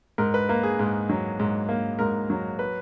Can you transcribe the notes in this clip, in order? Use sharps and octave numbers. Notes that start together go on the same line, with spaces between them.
G#2 A#4
B4
A#3 A#4
G#4
G#2
F#3
G#2
A#3
G#2 A#4
F#3
B4